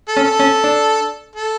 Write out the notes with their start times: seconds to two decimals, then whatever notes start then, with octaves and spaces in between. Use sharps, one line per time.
0.08 A4
0.17 C#4
0.24 A4
0.40 C#4
0.64 D4
1.36 A4